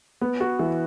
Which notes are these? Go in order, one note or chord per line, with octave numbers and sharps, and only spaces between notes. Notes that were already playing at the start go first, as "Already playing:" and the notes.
B3
F#4
E3